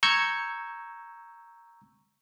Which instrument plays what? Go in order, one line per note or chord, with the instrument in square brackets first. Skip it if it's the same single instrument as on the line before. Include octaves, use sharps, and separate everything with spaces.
[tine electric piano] A#5 C#6 E6 G6 G#6 C#7